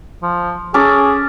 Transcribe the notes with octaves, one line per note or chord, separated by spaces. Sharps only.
F3
C#4 G#4 A4 D6